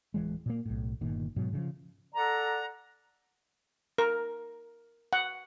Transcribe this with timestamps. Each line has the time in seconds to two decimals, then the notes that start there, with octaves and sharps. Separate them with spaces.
0.14 D1 E3 G#3
0.46 A#2 A#3
0.65 B1 A2
1.01 G1 A#2 D#3
1.36 G#2 B2 F#3
1.53 C#3 E3 F3
2.15 A4 D5 F#5 A#5
3.98 A#4
5.13 F#5